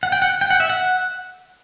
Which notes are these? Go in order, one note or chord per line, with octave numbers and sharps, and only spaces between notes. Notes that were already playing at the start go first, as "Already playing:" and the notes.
F#5
G5
F#5
G5
F#5
E5
F#5